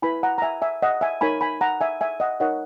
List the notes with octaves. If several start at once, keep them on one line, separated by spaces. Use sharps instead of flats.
E4 B4 G#5 B5
F#5 A#5
A#5
E5 G#5
E5 G#5
D#5 F#5
E5 G#5
D#4 A#4 C#5 G#5 B5
G#5 B5
F#5 A#5
E5 G#5
E5 G#5
D#5 F#5
D#4 A#4 C#5 D#5 F#5